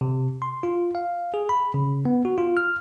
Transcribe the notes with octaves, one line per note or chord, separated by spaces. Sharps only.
C3
C6
F4
F5
G#4
B5
C#3
B3
F#4
F4
F6